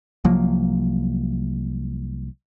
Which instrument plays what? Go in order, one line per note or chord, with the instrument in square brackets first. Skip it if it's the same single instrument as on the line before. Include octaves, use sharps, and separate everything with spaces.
[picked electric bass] C2 F3 F#3 A#3